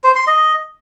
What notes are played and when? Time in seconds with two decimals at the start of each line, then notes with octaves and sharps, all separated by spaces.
0.04 C5
0.16 C6
0.27 D#5